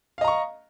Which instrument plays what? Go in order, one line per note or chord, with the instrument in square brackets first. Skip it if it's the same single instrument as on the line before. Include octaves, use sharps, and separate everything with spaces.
[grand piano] F5
D#5
A#5
C#6